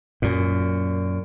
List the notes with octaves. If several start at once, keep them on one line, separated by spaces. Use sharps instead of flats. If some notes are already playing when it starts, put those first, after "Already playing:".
F#2 A#2